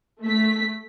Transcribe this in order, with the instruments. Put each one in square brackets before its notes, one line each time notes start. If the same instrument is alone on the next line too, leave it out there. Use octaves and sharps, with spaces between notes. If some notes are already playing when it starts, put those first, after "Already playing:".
[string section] A3 B6